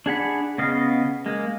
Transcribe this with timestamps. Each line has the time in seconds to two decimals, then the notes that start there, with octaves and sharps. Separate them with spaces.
0.06 D4 G#4 F#5 B5
0.58 C#3 B3 D#5 F5
1.26 G#3 A#3